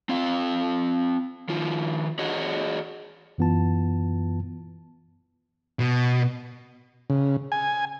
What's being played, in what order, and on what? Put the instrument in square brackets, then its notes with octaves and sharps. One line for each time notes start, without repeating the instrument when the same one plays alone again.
[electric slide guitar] C4 F4 F5
D#3 F3 F4
F#4 G#4 C#5 D#5
[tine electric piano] F#2 E3 B3 F4 A5
[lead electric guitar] B2
[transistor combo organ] C#3
G#5